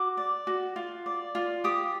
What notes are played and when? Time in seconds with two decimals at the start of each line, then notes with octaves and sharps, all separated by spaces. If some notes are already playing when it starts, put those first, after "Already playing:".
Already playing: F#4 D6
0.17 D5
0.47 F#4
0.76 F4
1.06 D5
1.35 F4
1.64 G4 D#6